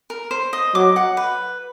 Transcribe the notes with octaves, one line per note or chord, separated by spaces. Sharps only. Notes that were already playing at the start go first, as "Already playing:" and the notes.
A#4
C5
D#5
F#3 D6
F#5
B4